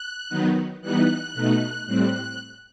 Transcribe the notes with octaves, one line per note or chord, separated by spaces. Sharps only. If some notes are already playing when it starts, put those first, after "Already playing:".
Already playing: F#6
D#3 F#3 B3 D#4
E3 G3 B3 D#4 F#6
B2 A3 D#4
A2 G3 C4 F#6